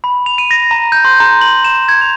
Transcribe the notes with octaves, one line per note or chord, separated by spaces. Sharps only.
B5
F7
D#7
A#6
A#5
G6
C6
A#5
F#7
E7
G#6
F7